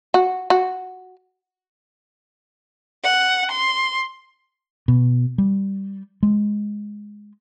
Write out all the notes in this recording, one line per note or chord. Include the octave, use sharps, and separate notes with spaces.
F#4
F#4
F#5
C6
B2
G3
G#3